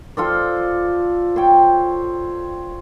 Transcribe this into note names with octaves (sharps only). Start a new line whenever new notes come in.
F4 A4 C5 D5
C5 C#5 G5